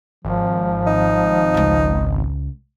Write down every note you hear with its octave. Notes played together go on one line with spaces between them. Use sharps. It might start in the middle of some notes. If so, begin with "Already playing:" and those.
G#1 F3
D#4
C#2 G#3